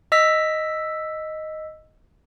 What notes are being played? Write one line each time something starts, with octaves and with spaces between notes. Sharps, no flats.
D#5 E6 B6